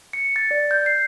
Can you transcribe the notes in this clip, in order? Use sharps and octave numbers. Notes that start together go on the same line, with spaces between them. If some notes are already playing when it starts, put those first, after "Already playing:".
C#7
A6
D5
G6
C7